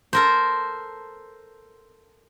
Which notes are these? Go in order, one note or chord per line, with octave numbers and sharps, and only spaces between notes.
A4 A#4 C5